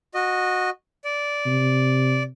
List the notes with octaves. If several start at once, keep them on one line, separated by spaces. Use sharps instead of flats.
F#4 D#5
D5
C3